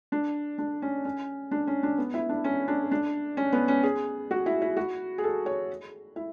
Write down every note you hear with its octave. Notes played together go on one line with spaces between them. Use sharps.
D4
D4
C#4
C#4
D4
C#4
D4
B3
E4
D4
C#4
D4
D4
C#4
B3
C#4
G#4
F#4
E4
E4
F#4
G#4
A4
C#5
E4